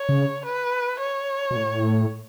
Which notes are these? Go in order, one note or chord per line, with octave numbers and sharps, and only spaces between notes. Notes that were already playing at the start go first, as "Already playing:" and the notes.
Already playing: C#5
C#3
B4
C#5
B2
A2